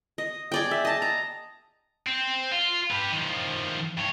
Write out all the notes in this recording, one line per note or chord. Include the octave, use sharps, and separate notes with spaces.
D#5
G#4 D5 G5
E5
D#5 A5
A#5
C4
F4
G4 B4
D#3 F3
G2 C#5